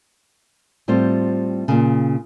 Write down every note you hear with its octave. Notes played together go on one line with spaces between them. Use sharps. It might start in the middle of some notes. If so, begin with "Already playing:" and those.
A2 G3 C4 F4 C5
A#2 C#3